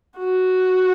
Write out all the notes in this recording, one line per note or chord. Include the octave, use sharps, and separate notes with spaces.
F#4